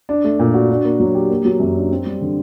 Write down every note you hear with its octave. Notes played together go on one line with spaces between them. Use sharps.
D4
A3
A#2
F#4
D4
A#3
F#3
G4
A#3
F#3
F#2
D4
C4
G3
D3